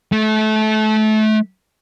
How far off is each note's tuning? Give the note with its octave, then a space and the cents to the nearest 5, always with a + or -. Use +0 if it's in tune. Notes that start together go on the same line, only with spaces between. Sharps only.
A3 -25